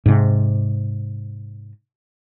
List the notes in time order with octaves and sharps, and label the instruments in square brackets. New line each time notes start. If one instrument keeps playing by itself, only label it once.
[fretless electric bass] G#2 C3